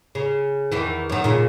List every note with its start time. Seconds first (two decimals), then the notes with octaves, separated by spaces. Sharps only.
0.15 C#3
0.72 E2 D#3 E3
1.10 F#2 D#3
1.24 A#2 C#3